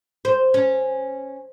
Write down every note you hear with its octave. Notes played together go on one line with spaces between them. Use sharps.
C5
C#4